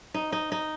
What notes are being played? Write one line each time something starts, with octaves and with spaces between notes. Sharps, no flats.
D#4
D#4
D#4